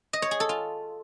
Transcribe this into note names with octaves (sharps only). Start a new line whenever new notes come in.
D#5
C#5
G#4
A4
F4